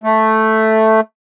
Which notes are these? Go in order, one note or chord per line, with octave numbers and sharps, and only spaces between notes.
A3